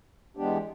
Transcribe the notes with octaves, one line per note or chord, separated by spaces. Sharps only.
E3 G#3 B3 D4 G4